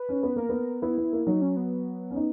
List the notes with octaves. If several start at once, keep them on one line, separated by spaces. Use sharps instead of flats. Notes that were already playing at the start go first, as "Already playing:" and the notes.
Already playing: B4
C#4
B3
A#3 A#4
B3
B3 E4
B3
A#3
F#3 D#4
C#4
B3
C#4
D#4